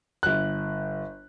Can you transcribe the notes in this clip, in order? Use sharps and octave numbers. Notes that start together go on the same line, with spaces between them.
G1 F#6